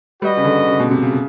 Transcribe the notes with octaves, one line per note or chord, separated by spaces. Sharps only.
G3 F#4 B4 D#5
C#3
D3
C#3
B2
C3
C#3